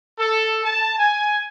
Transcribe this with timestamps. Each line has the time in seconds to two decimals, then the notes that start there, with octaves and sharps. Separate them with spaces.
0.19 A4
0.65 A5
0.99 G#5